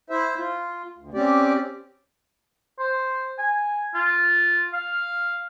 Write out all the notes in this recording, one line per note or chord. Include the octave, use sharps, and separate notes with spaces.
E4 C5 E5
F4
D2
C4 C#4 G4 D5
C5
G#5
F4
F5